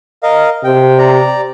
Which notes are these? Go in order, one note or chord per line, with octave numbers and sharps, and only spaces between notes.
A#4 D#5 F5
C3 G5
D5 A#5